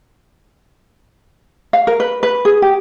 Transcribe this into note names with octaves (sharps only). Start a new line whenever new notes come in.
F5
A#4
B4
B4
G#4
G4